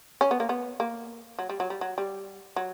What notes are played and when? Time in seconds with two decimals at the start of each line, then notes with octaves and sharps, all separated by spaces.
0.21 C#4
0.31 B3
0.40 A#3
0.49 B3
0.80 A#3
1.39 F#3
1.49 G3
1.60 F#3
1.70 G3
1.81 F#3
1.98 G3
2.56 F#3